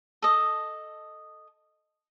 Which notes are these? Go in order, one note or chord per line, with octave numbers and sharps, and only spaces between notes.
A4 D#5